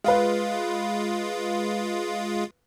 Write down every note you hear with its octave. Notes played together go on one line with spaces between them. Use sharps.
G#3 F4 B4 F5